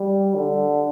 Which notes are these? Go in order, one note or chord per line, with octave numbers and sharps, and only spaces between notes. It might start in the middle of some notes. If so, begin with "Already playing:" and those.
Already playing: G3
D3